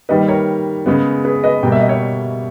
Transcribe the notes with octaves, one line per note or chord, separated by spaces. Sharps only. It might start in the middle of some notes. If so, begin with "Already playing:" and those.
D#3 G3 A#3 B4 D#5
A#4 C#5
C#3 G#3 B3
G#4 B4
B4 D#5
B2 G3 A#3 G5
E5
D#5
C#5 E5